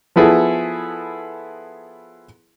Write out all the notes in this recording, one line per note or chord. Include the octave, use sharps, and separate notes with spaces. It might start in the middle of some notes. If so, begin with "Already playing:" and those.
F3 B3 E4 G#4 A4